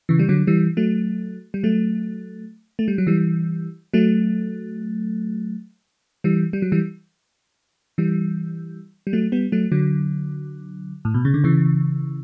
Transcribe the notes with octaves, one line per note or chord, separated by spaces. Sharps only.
C#3 E3
G3
D3 F#3
E3 G3
F#3 A3
G3
F#3 A3
A3
G3
F#3
E3 G3
F#3 A3
E3 G3
G3
F#3
E3 G3
E3 G3
G3
F#3 A3
G3 B3
F#3 A3
D3 F#3
A2
B2
C#3
D3
C#3 E3